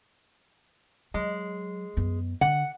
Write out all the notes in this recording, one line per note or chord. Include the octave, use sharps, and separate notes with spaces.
F#3 G#3
F#2 B3
D3 F#5